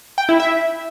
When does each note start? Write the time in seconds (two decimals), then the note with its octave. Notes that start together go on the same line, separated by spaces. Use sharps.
0.18 G5
0.29 E4
0.40 E5